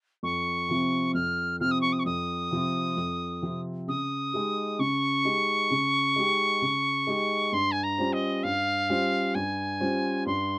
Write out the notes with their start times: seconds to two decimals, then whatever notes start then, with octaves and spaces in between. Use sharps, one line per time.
0.23 F2 C#6
0.69 C3 F3 C4
1.14 F2 F6
1.60 C3 F3 C4 F6
1.71 D#6
1.81 C#6
1.92 D#6
1.99 C#6
2.05 F2 D#6
2.51 C3 F3 C4
2.97 F2
3.42 C3 F3 C4
3.88 C#3 D#6
4.33 G#3 D#4 G4
4.79 C#3 C#6
5.25 G#3 D#4 G4
5.71 C#3
6.16 G#3 D#4 G4
6.62 C#3
7.07 G#3 D#4 G4
7.52 G2 C6
7.71 G#5
7.83 A#5
7.98 G3 C#4 F4 C5
8.13 D#5
8.43 G2 F5
8.89 G3 C#4 F4 C5
9.34 G2 G#5
9.80 G3 C#4 F4 C5
10.26 G2 C6